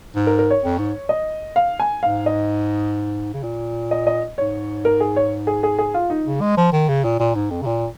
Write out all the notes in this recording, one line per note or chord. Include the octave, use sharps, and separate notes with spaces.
G#2
A#4
A#4
C#5
F2
G#2
D#5
F5
G#5
G#2 F5
D#5
C#3
A#2
D#5
D#5
G#2 C#5
A#4
G#4
C#5
G#4
G#4
G#4
F4
D#4
C#3
G#3
F3
D#3
C#3
A#2
A#2
G#2
F2
C#3
A#2